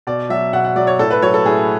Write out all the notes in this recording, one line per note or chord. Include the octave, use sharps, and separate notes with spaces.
B2 D5
F#3 E5
B2 F#5
F#5
F#3 D5
C#5
A2 A4
B4
F#3 C#5
A4
A2 G#4